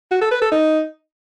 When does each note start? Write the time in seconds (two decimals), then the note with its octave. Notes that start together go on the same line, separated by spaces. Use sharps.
0.11 F#4
0.21 A4
0.31 B4
0.42 A4
0.52 D#4